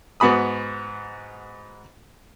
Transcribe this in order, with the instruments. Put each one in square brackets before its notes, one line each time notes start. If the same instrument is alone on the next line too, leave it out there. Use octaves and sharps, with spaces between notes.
[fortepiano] G#2 B3 F#4 B5 D#6